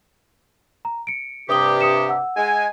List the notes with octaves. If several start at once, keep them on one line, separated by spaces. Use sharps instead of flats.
A#5
C#7 D7
G2 C3 G4 D6 D#6 G7
D#6 C#7 E7
F#5 E6
G#3 G#5